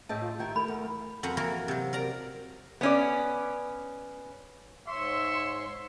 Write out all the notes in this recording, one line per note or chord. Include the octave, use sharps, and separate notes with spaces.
A2 G#4 D#5 E5 G5 A5
F4
D#3 E4 G4 G5
A3 A#4 B5
E2
F2 F#4 B4 F#5 A#5
E3 A#3 F#4 A#4
C3 F#3
A#4 D5 A#5
B3 C#4 D5
G#2 C#5 E5 C6 C#6